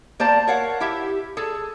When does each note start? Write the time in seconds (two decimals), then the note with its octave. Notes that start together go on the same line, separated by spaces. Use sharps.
0.20 A#3 C5 D5 A5
0.47 A#4 C#5 F5 F#5
0.80 E4 G4 E5
1.37 G#4 A4